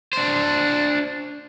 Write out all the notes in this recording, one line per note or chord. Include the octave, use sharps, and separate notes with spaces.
D4 C5